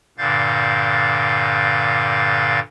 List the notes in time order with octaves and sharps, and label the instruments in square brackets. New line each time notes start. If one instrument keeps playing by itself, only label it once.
[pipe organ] G2 A#2 D3 F5 G6 A6